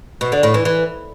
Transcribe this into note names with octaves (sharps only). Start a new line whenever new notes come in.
B2
D3
A2
E3
E3